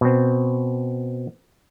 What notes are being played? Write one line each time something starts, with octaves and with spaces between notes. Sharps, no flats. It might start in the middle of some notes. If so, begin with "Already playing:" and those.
B2 C4